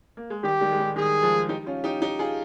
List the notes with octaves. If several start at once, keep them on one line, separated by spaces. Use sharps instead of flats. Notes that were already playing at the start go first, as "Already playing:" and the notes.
A#3
G#3
D#3 G3 G4
D#3 G3
G#3
D#3 G3
D#3 G3 G#4
F3 G#3
D#4 G4
C#4 F4
D#4 G4
D#4 G4
F4 G#4